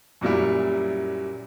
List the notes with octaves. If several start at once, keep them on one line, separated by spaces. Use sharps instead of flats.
F#2 A#2 F#3 G3 E4